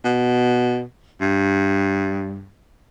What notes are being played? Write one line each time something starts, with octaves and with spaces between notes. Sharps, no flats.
B2
G2